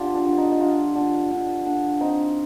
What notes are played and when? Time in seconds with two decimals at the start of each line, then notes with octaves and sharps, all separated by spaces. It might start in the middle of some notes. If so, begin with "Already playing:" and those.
Already playing: D3 F4 G4
0.14 D4
0.26 D3
0.38 D#4
0.51 D#4
0.61 D3 F4
0.96 D3
1.31 D3
1.66 D3
2.01 C4 D#4